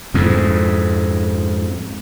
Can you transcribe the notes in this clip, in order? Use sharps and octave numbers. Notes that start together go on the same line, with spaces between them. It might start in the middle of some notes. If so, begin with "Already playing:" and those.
F2 G#2